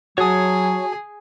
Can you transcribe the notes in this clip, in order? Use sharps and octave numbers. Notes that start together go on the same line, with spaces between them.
F#3 F#4 G#4 C#5 A5 D#6